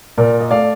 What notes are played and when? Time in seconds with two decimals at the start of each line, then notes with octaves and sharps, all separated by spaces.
0.18 A#2 A#4 D5
0.41 D#5
0.51 A3 D5 F5